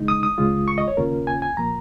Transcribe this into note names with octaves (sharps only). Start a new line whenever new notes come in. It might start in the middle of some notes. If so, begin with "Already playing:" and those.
Already playing: C#3 G#3 D#4
D#6
D#6
C#2 C#3 G#3 F4
C#6
D#5
C#5
D#2 C#3 A#3 C#4 F4 A#4
G#5
G#5
A#2 F3 A#3 A#5